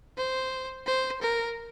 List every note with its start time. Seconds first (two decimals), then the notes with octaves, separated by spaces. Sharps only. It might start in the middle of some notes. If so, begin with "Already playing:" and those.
0.17 C5
0.86 C5
1.22 A#4